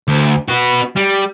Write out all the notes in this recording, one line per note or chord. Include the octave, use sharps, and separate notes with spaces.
D2
B3 F#4
G3